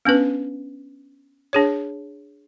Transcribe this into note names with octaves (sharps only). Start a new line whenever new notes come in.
B3 C#4 D4 B4
D4 G#4 C#5